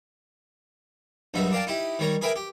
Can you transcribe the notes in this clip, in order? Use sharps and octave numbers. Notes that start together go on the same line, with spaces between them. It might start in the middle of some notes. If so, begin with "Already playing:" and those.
A#1 G2 F#3 D#4 E5
D4 A#4 F5 G5 A5
D#4 E4 G4
D#3 G3 C#5 A#5
G#4 A#4 B4 E5 G5 G#5
G4